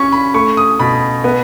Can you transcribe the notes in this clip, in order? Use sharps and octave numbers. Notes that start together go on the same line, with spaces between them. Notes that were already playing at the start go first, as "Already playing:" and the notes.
Already playing: C#4 C#6
B5
A3 C#6
D#6
B2 B5
B3